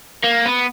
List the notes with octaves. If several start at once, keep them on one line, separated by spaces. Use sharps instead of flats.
A#3
B3